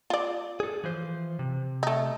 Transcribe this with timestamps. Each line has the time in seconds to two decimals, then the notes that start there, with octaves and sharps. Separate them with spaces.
0.10 F4 D5
0.60 G#4 A4
0.84 E3 F3 C5
1.39 C3
1.83 A3 D#4